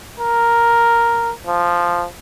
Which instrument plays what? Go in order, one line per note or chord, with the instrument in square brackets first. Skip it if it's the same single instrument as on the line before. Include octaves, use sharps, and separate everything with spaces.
[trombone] A#4
F3